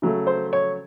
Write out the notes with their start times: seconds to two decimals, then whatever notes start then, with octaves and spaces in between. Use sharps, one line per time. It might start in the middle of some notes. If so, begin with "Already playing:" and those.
0.02 C#3 F#3 A3
0.27 C5
0.53 C#5